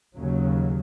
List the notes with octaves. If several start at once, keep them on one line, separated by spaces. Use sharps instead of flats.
D#2 C#3 F#3